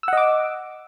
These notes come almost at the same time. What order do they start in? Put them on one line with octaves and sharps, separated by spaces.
E6 F#5 D#5 D6